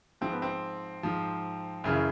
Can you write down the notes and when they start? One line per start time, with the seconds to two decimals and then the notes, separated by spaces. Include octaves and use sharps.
0.21 G#2 F3 C4
0.32 B3
0.42 C4
1.03 G#2 F3
1.84 F#2 C#3 E3